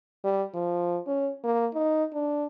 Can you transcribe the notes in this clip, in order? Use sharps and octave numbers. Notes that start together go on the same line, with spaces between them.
G3
F3
C#4
A#3
D#4
D4